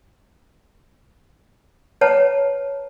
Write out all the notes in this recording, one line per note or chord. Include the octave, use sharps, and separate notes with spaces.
B4 C#5 F#5 A5 A#5